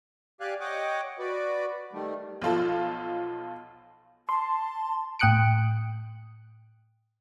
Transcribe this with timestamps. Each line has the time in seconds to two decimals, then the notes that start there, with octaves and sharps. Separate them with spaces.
0.41 G4 D5 F5 G#5 F#6
0.60 C#5 D#5 F#5 G5 D6
1.19 F#4 B4 D5
1.93 D#3 G3 A3
2.41 B1 F3 F4 A4
4.29 A5 C6
5.19 A2 G5 D#6 F#6 C#7 D7